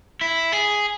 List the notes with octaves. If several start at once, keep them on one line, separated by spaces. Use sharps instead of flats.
E4
G#4